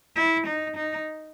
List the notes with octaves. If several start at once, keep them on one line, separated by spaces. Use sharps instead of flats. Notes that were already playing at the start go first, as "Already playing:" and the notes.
E4
D#4
D#4